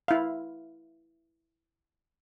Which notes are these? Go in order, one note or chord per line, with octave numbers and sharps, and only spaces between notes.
E4 F5